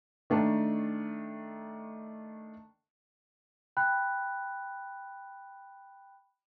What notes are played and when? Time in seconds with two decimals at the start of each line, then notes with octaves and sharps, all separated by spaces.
0.30 D#3 A3 D4
3.77 G5 B5 F#6